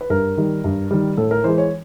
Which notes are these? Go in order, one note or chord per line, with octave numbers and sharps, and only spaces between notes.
B4
G2 A#4
D#3 G3
G2
D#3 G3
A2 A4
A#4
E3 G#3 C5
C#5